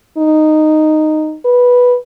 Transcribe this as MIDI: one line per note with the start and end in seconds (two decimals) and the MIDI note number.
0.18 1.37 63
1.45 1.97 71